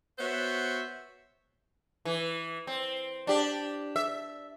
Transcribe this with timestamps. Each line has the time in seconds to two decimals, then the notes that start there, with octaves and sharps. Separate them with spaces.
0.19 B3 F#4 C5 C#5 E5 F#5
2.05 E3
2.67 C4
3.27 D4 G4
3.96 E5